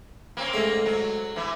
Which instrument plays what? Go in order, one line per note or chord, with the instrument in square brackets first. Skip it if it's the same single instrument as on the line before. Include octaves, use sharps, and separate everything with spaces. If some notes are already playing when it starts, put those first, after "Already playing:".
[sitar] A#3 C4 C#4
[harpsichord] G#2 A3
[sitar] F#3
E3 E4